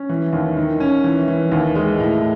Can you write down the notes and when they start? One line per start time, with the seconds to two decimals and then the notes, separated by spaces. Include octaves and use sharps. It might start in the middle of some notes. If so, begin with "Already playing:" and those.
Already playing: C#4
0.09 E3
0.33 D#2
0.57 D#3
0.80 C#4
1.04 E3
1.28 E3
1.52 D#2
1.75 G#3
2.00 A2